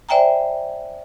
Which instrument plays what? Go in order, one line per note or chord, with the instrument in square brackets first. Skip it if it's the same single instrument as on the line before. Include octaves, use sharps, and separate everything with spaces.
[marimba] C5 D5 E5 G5 G#5 A#5